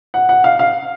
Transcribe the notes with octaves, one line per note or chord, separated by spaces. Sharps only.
F#5
F#5
F5
F5